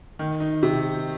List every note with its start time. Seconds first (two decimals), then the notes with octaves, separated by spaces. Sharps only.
0.19 D#3
0.40 D#4
0.63 C3